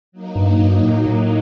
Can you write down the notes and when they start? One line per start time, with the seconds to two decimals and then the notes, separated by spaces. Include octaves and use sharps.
0.12 F#3 A#3 D#4
0.35 G2
0.59 G2
0.83 A2
1.06 A2